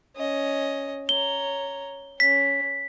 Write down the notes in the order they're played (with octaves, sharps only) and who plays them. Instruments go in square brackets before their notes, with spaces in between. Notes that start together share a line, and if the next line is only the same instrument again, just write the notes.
[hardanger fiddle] C#4 D#5
[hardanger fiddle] C#5 A#5 [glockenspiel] G7
[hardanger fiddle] C#4 [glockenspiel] B6